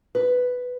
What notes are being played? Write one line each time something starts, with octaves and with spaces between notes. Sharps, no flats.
B4